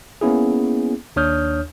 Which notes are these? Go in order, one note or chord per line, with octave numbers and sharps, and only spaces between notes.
A#3 B3 C#4 E4 G#4
D#2 D4 C#5 D#6 F6 G6